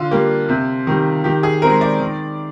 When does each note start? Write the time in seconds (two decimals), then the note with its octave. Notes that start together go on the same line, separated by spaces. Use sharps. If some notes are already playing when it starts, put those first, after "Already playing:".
Already playing: D3 F4
0.11 G3 A#3
0.49 C3
0.87 D#3 G3
1.24 D#3 G4
1.43 G#4
1.62 G#3 C4 A#4
1.81 D5
2.00 D#3